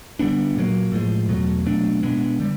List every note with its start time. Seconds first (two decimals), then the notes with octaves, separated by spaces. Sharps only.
0.19 D3 G3 B3 D4
0.56 A#2 F#3 A#3
0.92 A2 F3 G#3
1.29 E2 B2 F#3 A3
1.66 B2 F#3 A3 D4
2.03 B2 G#3 B3 D4
2.40 D3 G3